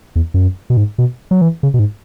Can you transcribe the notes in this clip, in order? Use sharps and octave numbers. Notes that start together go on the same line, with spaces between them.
E2
F#2
B2
G#2
B2
F#3
E3
C#3
B2
G#2